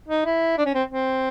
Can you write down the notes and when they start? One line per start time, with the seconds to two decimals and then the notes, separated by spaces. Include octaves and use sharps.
0.08 D#4
0.25 E4
0.58 D4
0.65 C#4
0.74 C4
0.90 C4